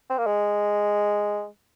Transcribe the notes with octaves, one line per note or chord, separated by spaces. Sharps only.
C4
A#3
G#3